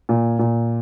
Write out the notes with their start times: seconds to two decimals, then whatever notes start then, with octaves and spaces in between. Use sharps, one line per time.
0.09 A#2
0.39 A#2